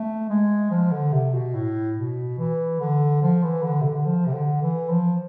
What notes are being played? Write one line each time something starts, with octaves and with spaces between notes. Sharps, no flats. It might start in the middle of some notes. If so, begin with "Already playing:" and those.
Already playing: A3
G#3
F3
D3
C3
B2
A2
B2
E3
D3
F3
E3
D3
C3
D3
F3
C3
D3
E3
F3